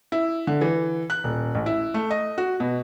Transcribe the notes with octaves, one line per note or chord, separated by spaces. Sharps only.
E4
D3
E3
F#6
D#1
A1
E4
A3
D#5
F#4
B2